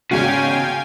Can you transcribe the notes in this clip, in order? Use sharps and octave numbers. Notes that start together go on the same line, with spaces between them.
E2 G#2 C#3 C#4 F#4 F5 G5 G#5